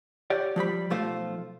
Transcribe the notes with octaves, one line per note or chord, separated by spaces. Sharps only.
G4 C#5 D5
F3 G3 G4 B5
B1 F3 A3 F4 C5 F5